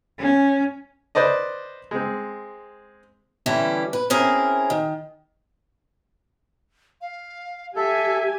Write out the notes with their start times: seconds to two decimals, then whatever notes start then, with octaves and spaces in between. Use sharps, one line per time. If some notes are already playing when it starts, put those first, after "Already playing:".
0.19 C#4
1.15 B4 C5 D5 D#5
1.91 G#3 C4
3.46 D3 E3 G3 C#4 E4
3.93 B4
4.10 C4 C#4 E4 G#4 A#4
4.70 D#3
7.01 F5
7.76 G4 A4 E5 G#5